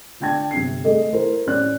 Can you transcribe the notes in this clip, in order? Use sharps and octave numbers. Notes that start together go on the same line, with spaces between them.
D3 D4 G5 A5 G#6
G1 C3 C7
A3 G#4 A4 D#5
E4 A#4 C5
A1 C#4 D5 F#6